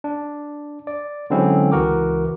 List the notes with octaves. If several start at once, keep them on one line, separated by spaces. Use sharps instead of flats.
D4
D5
D3 F#3 G#3 C4 C#4 E4
C#2 E3 F#4 A#4 D6